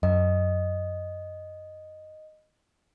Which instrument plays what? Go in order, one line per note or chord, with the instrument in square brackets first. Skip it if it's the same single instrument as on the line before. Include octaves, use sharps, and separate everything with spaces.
[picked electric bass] F#2 [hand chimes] D#5